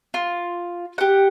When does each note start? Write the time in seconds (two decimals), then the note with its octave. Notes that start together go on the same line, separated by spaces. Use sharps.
0.14 F4
0.98 G4 F#5